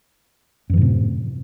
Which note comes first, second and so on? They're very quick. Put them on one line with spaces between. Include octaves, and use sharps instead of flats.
F#2 E3 A2 C3